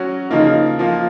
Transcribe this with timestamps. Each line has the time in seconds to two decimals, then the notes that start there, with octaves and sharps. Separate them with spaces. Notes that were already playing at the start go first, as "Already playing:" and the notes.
Already playing: F#3 C#4 F#4
0.31 C#3 F3 A#3 D#4
0.79 F3 A#3 F4